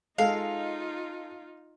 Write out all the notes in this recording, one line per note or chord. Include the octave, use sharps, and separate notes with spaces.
G#3 D#4 F4 A4 F5